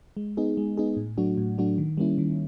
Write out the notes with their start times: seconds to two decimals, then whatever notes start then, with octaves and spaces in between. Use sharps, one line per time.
0.17 G#3
0.37 B3 D#4 G#4
0.57 G#3
0.77 B3 D#4 G#4
0.97 A2
1.17 F#3 A3 D4 F#4
1.37 A2
1.58 F#3 A3 D4 F#4
1.78 D#3
1.97 G3 A#3 C#4 E4
2.18 D#3